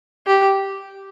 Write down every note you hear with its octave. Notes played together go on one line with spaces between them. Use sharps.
G4